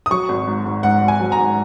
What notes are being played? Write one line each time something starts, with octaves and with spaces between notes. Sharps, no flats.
D#6
F#3 C#6
G#1
G#2
G#2
G#2 F#5
G#1
G#5
F#3
A#5
G#2